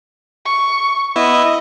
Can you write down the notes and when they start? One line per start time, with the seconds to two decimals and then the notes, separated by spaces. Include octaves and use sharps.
0.45 C#6
1.16 B3 E4 D#5 E5